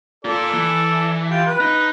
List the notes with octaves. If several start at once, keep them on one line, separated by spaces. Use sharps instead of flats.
A#3 F4 A4 D5
E3
F4 G4
B4
D#4